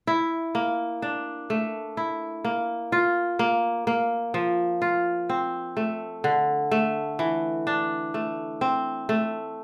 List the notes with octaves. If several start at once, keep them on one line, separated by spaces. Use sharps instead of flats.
E4
A#3
D4
A3
E4
A#3
F4
A#3
A#3
F3
F4
C4
A3
D3
A3
E3
D4
A3
C4
A3